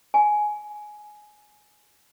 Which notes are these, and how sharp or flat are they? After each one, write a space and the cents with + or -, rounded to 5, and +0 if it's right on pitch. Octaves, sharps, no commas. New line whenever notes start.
G#5 +15